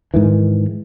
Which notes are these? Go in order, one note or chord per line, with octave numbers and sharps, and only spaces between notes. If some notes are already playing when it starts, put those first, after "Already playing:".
G#2 D#3 E3